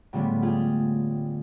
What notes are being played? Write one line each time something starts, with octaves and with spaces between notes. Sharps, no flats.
A2 D3 F3 G3 G#3 B3
F4 G4 G#4